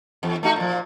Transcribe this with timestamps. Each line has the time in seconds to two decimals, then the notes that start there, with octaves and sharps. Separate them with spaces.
0.23 E2
0.43 A3 D#4 F#4
0.56 A#2 F3